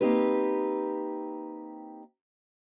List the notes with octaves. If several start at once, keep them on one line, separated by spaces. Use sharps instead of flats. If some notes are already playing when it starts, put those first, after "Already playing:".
A#3 C4 D#4 G4 B4